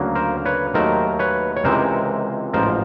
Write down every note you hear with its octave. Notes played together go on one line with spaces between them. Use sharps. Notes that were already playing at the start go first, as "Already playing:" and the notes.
Already playing: D2 C#3 F#3 A#3
A#4 C5
B4 C#5
D#2 D#3 F#3 A3 A#4 C5
B4 C#5
C#5
C#2 C3 E3 G#3 A#4 C5
A1 G#2 F3 A#4 C5